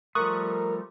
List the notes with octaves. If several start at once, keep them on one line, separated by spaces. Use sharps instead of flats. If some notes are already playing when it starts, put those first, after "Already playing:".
F3 G3 A3 A#4 C#6 D#6 F#6